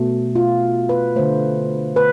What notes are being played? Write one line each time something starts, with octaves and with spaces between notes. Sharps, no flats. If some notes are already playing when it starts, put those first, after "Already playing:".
Already playing: B2 A3
F4
B4
D3 A3 C5
B4